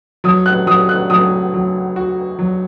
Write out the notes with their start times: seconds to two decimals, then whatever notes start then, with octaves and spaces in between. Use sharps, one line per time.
0.24 F#3 D#6
0.46 F#6
0.67 F#3 D#6
0.89 F#6
1.10 F#3 D#6
1.54 F#3
1.96 F#4
2.39 F#3